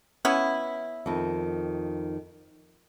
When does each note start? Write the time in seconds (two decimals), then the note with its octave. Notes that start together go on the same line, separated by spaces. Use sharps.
0.25 B3 C#4 E4
1.06 F2 D#3